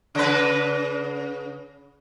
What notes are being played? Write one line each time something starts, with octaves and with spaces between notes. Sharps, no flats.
C#3 B4